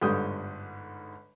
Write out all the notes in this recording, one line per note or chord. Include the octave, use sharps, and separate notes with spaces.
G1 G#2 D3 G3 D#6 G6